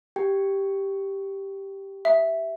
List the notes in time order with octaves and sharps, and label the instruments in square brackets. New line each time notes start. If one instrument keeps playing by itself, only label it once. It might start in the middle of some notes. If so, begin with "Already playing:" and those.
[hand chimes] G4 G5
[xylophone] E5